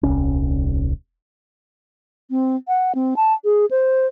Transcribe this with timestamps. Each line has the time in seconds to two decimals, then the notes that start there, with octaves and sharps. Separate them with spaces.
0.03 D#1 C2 C#4
2.30 C4
2.68 F#5
2.95 C4
3.16 A5
3.44 G#4
3.71 C5